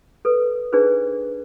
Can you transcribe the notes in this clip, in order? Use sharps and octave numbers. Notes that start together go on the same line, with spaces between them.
A4 B4
D4 D#4 G#4 B4 C5